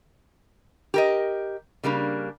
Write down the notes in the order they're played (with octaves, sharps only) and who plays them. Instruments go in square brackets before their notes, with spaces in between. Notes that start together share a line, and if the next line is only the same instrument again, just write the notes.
[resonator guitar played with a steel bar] G4 A#4 D#5
C#3 G3 A#3 D4